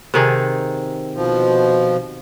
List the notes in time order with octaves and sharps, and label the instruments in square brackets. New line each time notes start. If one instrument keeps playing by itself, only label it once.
[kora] C3 D#3 G#4
[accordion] B2 F3